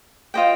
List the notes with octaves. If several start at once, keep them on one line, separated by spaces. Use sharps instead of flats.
F4 C5 D#5 G5